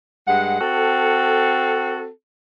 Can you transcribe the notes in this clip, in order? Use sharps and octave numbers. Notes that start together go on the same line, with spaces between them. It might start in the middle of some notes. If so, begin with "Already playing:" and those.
G2 G#3 F#5
C4 F#4 A4